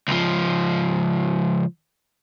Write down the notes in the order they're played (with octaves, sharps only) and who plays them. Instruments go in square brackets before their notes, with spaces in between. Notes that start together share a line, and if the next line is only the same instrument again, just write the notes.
[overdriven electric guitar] C#2 F3